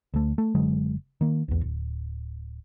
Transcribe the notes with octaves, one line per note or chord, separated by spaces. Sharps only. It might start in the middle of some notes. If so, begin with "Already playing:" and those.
D2 A3
A3
F#1 D3 F#3 G#3
D#3 A#3
B1 E2
D1